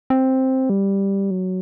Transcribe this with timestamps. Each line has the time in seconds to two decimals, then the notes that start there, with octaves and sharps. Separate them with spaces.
0.10 C4
0.70 G3
1.31 F#3